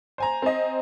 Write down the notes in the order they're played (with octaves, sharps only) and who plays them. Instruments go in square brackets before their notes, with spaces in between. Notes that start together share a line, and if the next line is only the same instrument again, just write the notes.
[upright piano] C5 G#5 A#5
[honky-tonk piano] C4 D#5